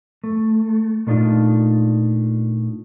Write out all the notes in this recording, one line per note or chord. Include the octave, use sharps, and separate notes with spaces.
A3
A#2 A3 D4 D#4 F4